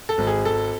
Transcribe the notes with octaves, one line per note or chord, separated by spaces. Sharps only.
A4
G#1
G#4
G#1 A4